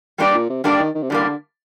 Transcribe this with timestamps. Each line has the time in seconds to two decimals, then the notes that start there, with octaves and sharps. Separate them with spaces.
0.18 G2 G3 A#3 D4 G4 D5
0.34 A#2
0.50 C3
0.64 D3 G3 A#3 D4 G4 D5
0.79 D#3
0.95 D#3
1.02 C3
1.10 A2 D3 G3 A#3
1.24 D3